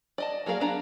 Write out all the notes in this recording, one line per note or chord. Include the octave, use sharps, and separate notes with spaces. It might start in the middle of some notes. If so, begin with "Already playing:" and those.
D5 D#5 A5
F#3 A#3 G#4 A#4 F5
B3 D4 A#5